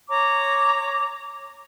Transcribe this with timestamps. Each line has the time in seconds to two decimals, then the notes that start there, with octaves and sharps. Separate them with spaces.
0.10 C#5 A#5 D6